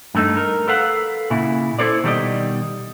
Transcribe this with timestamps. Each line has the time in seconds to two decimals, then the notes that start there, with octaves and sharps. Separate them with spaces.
0.15 G2 A3 D#4
0.37 A#4
0.68 A4 B4 F5 F#5
1.30 A#2 C#3 E4
1.79 E4 A4 C5 D5
2.03 B2 D#3 G3 G#4 D5 D#5